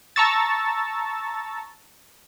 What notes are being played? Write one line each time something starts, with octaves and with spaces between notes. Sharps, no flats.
A5 A#5 C#6 E6 A6